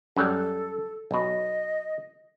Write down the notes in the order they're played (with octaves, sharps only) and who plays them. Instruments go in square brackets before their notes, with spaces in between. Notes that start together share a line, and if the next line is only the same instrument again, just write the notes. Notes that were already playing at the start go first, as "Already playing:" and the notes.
[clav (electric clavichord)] F#2 F#3 G3 [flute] A4
[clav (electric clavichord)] B1 B2 [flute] D#5